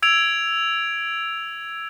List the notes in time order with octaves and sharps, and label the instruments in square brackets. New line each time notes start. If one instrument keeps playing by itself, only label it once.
[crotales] E6 G#6 D7 F7